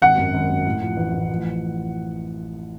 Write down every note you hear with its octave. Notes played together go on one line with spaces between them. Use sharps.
G#1 F#5
F#2
G#1
F#2
A2
F3
A1
A1
F3